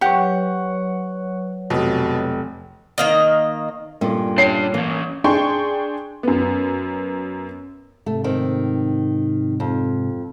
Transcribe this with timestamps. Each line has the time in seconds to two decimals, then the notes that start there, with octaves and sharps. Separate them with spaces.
0.01 F#3 G4 B4 C#5 F#5 C#6
1.70 F1 B2
2.98 D#3 A#3 D#5
4.01 G2 A#2 C#4 A4 A#4
4.38 D4 C#5 G5 C7
4.74 E3 A#3 C#4
5.24 D4 G#4 G5 C6 C#6
6.23 F#2 B3
8.06 G#2 C3 A3
8.24 D#3 C4
9.60 F2